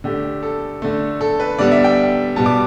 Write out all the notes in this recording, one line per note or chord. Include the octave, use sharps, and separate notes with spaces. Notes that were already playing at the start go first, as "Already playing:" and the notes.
D3 A3 G4
A4
D3 A3
A4
B4
D3 G3 B3 D5
E5
G5
B2 G3 B3 A5
D6